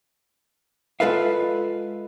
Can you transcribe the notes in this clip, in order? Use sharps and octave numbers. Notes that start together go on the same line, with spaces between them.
G#3 F4 A4 B4 E5 F5